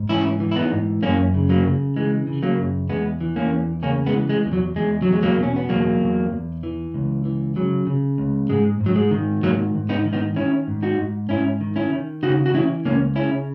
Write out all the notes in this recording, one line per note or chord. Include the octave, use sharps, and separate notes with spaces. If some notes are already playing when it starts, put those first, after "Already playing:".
Already playing: G#2
E3 C#4 E4
E3
E4
B3 D#4
G#2
F#2 A#3 C#4
C#3
F#3 A#3
C#3
E3 G#3
C#3
F#3 A#3
F#2
E2 G#3 B3
E3
A#3 C#4
E2
C#3 A#3 C#4
G#3 B3
E3
G#3
E2
F#3
E2 G#3
E2 F#3
G#3
F#3 A#3
B2 C#4
B3
E2 F#3 A#3
E2
E2
E3
C#2
E3
C#3 F#3
C#3
C#2
G#2 G#3
G#2
F#3
G#3
D#3
G#2 F#3 A#3
G#2
B3 D#4
D#3
B3 D#4
D#3 C#4 E4
G#2
D#4 F#4
G#2
G#2 C#4 E4
D#3
C#4 E4
D#3
C#3 D#4 F#4
F#4
E3 C#4 E4
C#2 A#3 C#4
C#3 C#4 E4